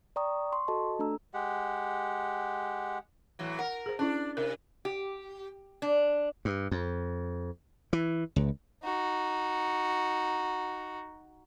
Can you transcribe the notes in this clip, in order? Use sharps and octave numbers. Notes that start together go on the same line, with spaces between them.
D5 G5 A#5 C#6 D#6
C6 C#6
F#4 A4 D#5 A5
A3 D4 A4 A#5 E6
G#3 G4 F#5
A2 E3 F#3
A#4 F#5
G#4 C5
C#4 D4 E4
C3 A#4
G4
D4
G2
F2
E3
C#2
D#4 F#4